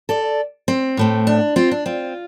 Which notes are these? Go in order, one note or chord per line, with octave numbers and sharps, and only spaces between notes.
A4 D5
C4
A2 A3 C4
D4
C4 F4
D4
C4 F4